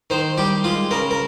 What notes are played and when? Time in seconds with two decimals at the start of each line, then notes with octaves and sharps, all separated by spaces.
0.10 D#3 C5
0.38 G3 G4
0.64 G#3 F4
0.91 C#3 A#4
1.11 A#4